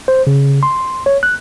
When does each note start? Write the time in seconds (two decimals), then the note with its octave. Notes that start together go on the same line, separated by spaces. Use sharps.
0.08 C5
0.27 C#3
0.63 C6
1.06 C#5
1.23 F#6